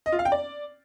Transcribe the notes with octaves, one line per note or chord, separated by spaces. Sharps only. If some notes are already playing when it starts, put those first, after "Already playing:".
D#5
F4
F5
G5
D5